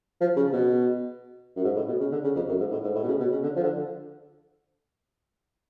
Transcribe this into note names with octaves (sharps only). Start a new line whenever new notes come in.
F3
C#3
B2
F#2
G#2
A2
B2
C#3
D3
C#3
F2
F#2
G#2
A2
G#2
A2
B2
C#3
B2
C#3
D3
F3
D3